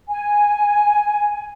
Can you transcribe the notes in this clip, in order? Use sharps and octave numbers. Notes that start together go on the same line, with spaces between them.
G#5